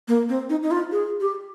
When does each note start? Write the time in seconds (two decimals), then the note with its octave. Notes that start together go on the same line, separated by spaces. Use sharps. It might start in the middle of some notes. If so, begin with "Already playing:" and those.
0.08 A#3
0.29 C4
0.49 D#4
0.63 D#4
0.71 F4
0.92 G#4
1.20 G4